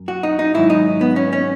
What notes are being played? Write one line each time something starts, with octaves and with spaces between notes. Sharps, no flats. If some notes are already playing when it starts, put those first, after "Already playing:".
Already playing: F#2
F#4
D#4
D#4
G#2 D#3 F#3 E4
D#4
B3
C#4
C#4